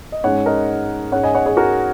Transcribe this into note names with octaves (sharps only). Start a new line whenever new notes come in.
D#5
G#2 G#3 C#4 C#5 F#5
A#4 D#5
G#2 G#3 C#4 C#5 F#5
D#5 G#5
C#5 F#5
G#4 C#5
F#4 A#4